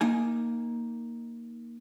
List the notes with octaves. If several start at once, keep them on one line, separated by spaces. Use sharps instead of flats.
A#3 D#4 G#5